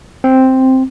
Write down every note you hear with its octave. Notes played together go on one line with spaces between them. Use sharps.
C4